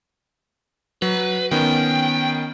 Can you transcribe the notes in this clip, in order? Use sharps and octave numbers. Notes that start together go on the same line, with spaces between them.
F#3 B4
D#3 B3 C#4 G5